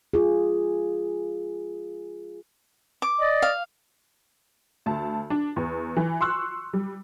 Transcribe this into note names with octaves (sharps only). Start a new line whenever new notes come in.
F4 G#4
D6
D5 D#5
F5
D2 A5
D4
E2
E3
C6 C#6 E6 F#6
G3